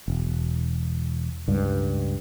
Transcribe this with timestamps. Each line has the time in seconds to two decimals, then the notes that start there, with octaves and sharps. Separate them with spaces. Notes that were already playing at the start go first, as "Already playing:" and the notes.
0.08 E1
1.48 C#2 G2